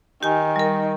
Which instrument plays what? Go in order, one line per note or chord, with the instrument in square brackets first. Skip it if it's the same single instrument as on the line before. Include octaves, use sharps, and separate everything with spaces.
[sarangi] D#3 [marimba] G4 G#5
[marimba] G3 A#4